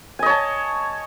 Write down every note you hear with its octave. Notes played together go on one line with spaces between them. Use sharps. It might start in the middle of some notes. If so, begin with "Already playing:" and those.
C#5 D#5 G#5 A5